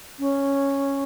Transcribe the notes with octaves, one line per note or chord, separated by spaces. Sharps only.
C#4